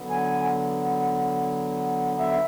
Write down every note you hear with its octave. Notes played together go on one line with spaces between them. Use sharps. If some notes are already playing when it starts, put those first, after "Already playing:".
Already playing: D3 F#3 B3
G#5
E5